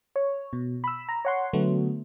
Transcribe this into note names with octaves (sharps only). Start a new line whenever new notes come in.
C#5
B2
B5 E6
A#5
C#5 F#5 C6
D3 F#3 A3 B3